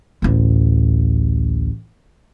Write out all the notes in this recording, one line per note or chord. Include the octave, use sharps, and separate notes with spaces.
A1 D2